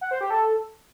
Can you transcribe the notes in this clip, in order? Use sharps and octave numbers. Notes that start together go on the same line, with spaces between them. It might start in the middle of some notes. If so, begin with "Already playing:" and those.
F#5
C5
G4
A4